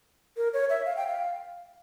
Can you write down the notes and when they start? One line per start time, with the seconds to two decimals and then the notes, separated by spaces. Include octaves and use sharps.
0.37 A#4
0.53 C#5
0.70 E5
0.86 F5
0.97 G5
1.07 F5